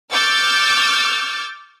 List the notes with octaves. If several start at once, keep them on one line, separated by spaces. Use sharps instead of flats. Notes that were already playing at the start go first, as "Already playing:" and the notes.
C#6 D6 E6 F6 G6 A6